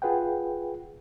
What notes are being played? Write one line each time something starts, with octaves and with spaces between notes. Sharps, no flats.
F4 G#4 B4 F#5 G5